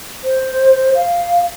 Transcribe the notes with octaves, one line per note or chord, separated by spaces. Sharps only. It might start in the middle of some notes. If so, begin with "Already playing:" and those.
C5
F5